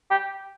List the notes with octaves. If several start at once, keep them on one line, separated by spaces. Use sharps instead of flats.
G4